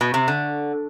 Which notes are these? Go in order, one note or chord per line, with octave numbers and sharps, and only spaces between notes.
B2
C3
D3